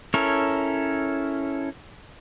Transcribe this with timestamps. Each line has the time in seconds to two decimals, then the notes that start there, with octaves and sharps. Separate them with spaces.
0.14 C#4 E4 A4 A#4 C#5